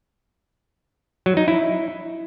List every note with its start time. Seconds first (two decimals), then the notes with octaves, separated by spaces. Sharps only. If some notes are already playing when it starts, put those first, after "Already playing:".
1.26 F#3
1.37 D#4
1.48 E4